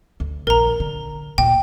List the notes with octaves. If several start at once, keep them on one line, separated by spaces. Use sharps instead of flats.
D2
A#1 D#2 A#4 A#5
D3
D2 A#2 G5